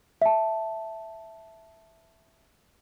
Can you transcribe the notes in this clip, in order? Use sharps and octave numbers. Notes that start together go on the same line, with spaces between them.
E5 A5